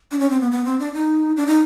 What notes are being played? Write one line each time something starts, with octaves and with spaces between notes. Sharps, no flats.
D4
C#4
C4
B3
B3
C4
D4
D#4
D4
D#4